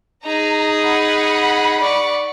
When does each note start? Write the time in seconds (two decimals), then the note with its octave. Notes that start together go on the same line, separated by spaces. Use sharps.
0.25 D#4 G#4 A#5
0.81 F#5 B5
1.81 D5 C#6